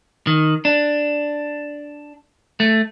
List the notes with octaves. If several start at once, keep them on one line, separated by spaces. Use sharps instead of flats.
D#3
D4
A3